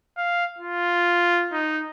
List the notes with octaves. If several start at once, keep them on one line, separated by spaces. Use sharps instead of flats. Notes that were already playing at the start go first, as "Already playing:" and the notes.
F5
F4
D#4